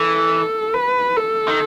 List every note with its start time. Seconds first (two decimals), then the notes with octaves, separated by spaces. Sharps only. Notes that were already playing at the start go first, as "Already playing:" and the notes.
Already playing: E3 A4
0.74 B4
1.17 A4
1.48 D#3